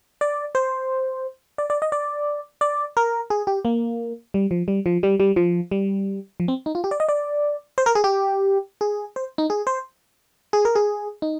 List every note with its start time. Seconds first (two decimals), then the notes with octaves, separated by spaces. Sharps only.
0.21 D5
0.55 C5
1.58 D5
1.70 D5
1.82 D#5
1.92 D5
2.61 D5
2.97 A#4
3.30 G#4
3.47 G4
3.65 A#3
4.34 G3
4.51 F3
4.68 G3
4.86 F3
5.03 G3
5.20 G3
5.36 F3
5.71 G3
6.40 F3
6.48 C4
6.66 D#4
6.75 F4
6.84 G4
6.91 D5
7.00 D#5
7.09 D5
7.78 C5
7.86 A#4
7.95 G#4
8.04 G4
8.81 G#4
9.16 C5
9.38 D#4
9.50 G#4
9.67 C5
10.53 G#4
10.65 A#4
10.75 G#4
11.22 D#4